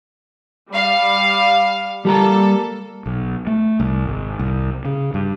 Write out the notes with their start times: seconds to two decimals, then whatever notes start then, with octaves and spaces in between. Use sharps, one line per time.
0.71 G3 F5
2.05 G3 A#3 G4 A4 A#5
3.06 B1
3.47 A3
3.80 C2
4.06 G#1
4.39 C2
4.85 C#3
5.14 G2